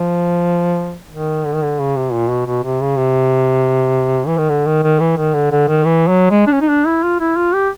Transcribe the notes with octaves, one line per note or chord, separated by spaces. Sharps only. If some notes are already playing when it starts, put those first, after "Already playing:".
Already playing: F3
D#3
D3
D#3
D3
C#3
C3
A#2
B2
B2
C3
C#3
C3
E3
D#3
D3
D#3
D#3
E3
D#3
D3
D3
D#3
E3
F#3
G#3
D4
C#4
D#4
D4
E4
F4
E4
F4
G4